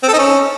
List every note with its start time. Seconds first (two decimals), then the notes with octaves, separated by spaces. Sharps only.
0.03 C4
0.08 A4
0.13 D#4
0.19 C#4